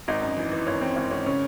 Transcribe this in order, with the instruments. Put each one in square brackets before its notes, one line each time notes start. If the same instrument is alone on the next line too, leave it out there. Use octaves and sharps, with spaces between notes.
[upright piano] G#1 D#4
F#2
E3
E3
G#1 C#4
E3 C4
G#1 C#4
G#1 C#4
C#3 C#4